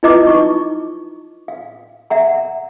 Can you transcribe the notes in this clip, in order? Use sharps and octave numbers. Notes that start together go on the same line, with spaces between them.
E4 F4 B4 D#5 A#5 D6
D#4 C#6
F5
E5 F#5 A#5